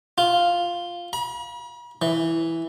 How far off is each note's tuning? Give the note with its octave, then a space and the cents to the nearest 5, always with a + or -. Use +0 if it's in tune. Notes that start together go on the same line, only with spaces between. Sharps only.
F4 +0
B5 -45
E3 +0